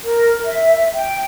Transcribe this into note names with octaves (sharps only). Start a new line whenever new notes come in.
A#4
E5
G5